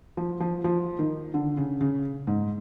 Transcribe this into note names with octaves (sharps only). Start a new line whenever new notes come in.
F3
F3
F3
D#3
D3
C#3
C#3
G#2